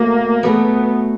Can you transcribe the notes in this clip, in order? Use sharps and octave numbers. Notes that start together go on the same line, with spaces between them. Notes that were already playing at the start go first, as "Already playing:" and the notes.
Already playing: B2 F#3 A3 A#3
B2 F#3 A3 B3